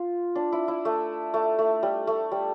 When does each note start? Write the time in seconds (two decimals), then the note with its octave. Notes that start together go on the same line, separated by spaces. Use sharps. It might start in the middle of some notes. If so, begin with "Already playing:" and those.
Already playing: F4
0.35 D4
0.52 E4
0.68 E4
0.85 A3
1.34 A3
1.59 A3
1.83 G3
2.07 A3
2.32 G3